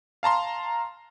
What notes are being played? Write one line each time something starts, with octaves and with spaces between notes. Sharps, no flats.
F5 A5 A#5 C6